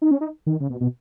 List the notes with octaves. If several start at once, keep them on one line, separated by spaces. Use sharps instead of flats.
D#4
C#4
D#4
D#3
C#3
B2
B2